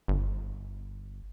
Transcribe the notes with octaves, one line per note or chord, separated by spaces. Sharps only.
G1